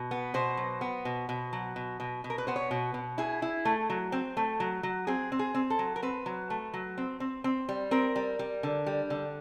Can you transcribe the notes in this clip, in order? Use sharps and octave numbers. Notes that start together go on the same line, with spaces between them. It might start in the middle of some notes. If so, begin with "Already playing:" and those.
Already playing: B2
B3
B2 C5
F#3
B3
B2
B2
F#3
B2
B2
B2
A#4
B4
B3 C5
C#5
B2
B2
E4 G#4
E4
A3
F#3
C4
A3
F#3
F#3
C4 G#4
C4
G#4
C4
A4
F#3
A#4
C4 B4
F#3
A3
F#3
C4
C4
C4
G3
C4 A#4
G3
G3
D3
G3
D3